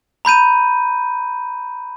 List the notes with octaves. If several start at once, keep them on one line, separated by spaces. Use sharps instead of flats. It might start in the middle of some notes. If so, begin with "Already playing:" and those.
A#5 B5 G6 D#7